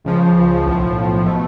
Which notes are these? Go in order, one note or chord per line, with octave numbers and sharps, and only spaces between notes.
C#2 C#3 F3
B1 A2 F3
B2 A3